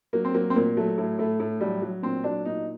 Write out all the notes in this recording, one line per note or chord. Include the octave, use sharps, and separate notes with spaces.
F#3 A#3
C4
F#3 A#3
C4
A#2 A#3
F#3 A3
A2
A2 A3
A2
F#3 G3
F#3
A#2 C4
F#3 D4
A#2 D#4